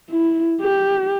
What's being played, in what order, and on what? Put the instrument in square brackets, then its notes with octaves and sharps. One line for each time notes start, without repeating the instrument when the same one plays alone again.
[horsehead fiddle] E4
G4